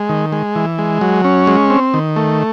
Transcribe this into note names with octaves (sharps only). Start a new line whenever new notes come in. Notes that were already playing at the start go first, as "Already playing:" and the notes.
Already playing: G#3
D#3
G#3
E3
G#3
F#3
C#4
G#3
C4
D#3
A3